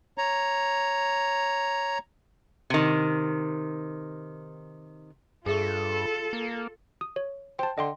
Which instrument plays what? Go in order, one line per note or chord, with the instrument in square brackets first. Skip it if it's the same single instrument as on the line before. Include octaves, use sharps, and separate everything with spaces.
[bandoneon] C#5 A#5
[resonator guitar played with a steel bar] C3 D#3
[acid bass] G2 [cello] F4 A4 [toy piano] G#4 E5 C#6
[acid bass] A#3
[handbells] D#6
C#5
[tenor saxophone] C5 [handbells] G5 A5
[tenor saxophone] D3 [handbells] D#5 G5 C6